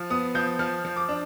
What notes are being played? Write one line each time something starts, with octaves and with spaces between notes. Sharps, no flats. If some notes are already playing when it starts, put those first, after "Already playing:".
Already playing: F3
B3 D#6
F3 G6
F3 F6
F3
D6
D4